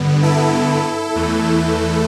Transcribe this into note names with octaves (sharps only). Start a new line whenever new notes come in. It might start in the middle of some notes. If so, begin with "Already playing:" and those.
Already playing: G2 D3 B3
E4 A4
E2 E3 A3